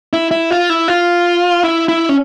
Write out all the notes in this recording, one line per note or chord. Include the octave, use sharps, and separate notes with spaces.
E4
E4
F4
E4
F4
E4
E4
C#4